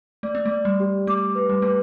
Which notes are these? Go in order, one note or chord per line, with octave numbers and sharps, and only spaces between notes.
A3 D5
B3
A3
D5
G3
G4
A3 D6
B4
G3
A3 B4